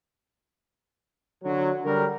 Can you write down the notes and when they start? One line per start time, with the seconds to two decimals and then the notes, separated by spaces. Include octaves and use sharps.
1.43 D3 F#3
1.85 D3 F#3 G3 F#4 A#4